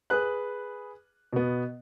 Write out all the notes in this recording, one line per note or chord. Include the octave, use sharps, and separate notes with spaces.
G#4 B4 F#6
B2 B3